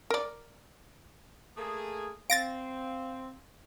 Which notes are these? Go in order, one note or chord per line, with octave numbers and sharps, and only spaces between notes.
A#4 D5
A3 A#3 G#4
C4 F5 A6 A#6 D7